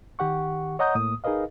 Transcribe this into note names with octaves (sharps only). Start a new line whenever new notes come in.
D#3 G4 F#5 C#6
C#5 D#5 F#5 A#5 D#6 G6
A2 A#3 D#6
D#4 G#4 A#4 B4 D#5 F5